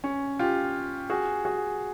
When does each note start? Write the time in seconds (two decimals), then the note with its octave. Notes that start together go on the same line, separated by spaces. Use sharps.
0.04 C#4
0.39 F4 G4
1.10 F#4 G#4
1.45 F#4 G#4